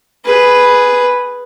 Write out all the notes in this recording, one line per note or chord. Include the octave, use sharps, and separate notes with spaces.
G#4 B4